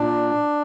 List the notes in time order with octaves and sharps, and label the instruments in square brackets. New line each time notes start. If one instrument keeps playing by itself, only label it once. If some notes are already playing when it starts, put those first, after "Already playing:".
Already playing: [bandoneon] A#2 D4